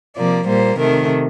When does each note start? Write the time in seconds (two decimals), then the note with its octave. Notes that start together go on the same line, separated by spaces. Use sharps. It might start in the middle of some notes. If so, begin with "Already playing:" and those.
0.16 C3 F3 A#3 D5
0.47 A#2 G3 A#3 C5
0.79 C3 D#3 A3 A#4